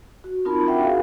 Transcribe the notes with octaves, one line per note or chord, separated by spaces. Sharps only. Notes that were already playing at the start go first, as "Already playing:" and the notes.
F#4
C4 D#4 F4 A#4 A5 B5
D4 F#4 E5 F#5 G5
F#4 G#4 A#4 F5